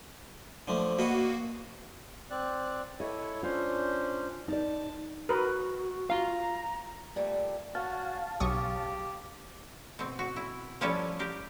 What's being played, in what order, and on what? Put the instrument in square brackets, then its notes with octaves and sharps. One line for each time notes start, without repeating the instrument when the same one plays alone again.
[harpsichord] D3 F3 A3
[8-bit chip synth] A#3 F#4 [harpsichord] B4 D#5 F#5
[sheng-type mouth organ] C4 D5 F#6
[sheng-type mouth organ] E4 A4 C#5 [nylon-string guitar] D#5
[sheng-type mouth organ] C#4 D4 C5 [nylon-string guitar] F4
[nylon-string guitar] D#4 D5 [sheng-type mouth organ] A5
[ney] F#4 [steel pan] A#4 B4
[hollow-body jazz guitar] F4 F5 [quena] A#5
[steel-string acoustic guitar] A#2 G3 A3
[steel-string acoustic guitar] C#4 [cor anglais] F#4 [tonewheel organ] F5 A5
[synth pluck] B1 C#6 D#6 [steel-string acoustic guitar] C#3 [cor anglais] G4
[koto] B2 C4
F#4
E4
F3 G3 C#4 E4 A4 B4
G4 A#4